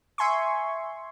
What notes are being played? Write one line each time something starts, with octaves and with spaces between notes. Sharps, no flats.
E5 G#5 C6 C#6